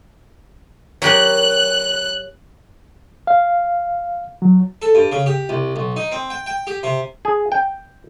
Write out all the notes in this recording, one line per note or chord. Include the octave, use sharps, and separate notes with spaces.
F#3 G4 A#4 F#6
F5
F#3
A4
G2
C#3
G4
C2
B1
D#4
C4
G5
G5
G4
C3
G#4
G5